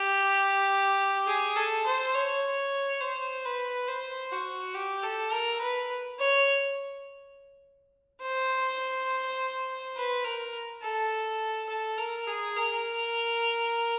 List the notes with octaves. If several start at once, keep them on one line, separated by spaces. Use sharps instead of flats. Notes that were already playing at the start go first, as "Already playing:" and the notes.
Already playing: G4
G#4
A4
C5
C#5
C5
B4
C5
F#4
G4
A4
A#4
B4
C#5
C5
B4
A#4
A4
A4
A#4
G#4
A#4